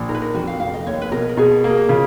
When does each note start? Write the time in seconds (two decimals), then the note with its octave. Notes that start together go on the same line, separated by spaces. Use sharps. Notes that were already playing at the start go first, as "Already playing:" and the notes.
Already playing: A#1
0.09 D#4 A#4
0.14 B4
0.22 A#4
0.35 F2 F#4
0.47 F5
0.60 F1 F5
0.74 D#5
0.87 D#2 C#5
1.02 B4
1.11 B2 A#4
1.29 A#4
1.37 B2 G#4
1.64 A#3 G#4
1.78 F#4
1.89 C#3 F4